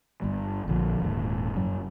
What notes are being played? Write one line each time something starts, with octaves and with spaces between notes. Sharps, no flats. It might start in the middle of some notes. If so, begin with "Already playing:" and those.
G1 G3
A#1 D3 F3
D#1 G#2
F#1 F#3